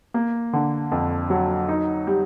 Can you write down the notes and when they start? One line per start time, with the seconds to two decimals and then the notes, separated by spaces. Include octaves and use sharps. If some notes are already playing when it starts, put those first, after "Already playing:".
0.14 A#3
0.53 D3
0.92 F2
1.30 F#3
1.69 D#4
2.07 G3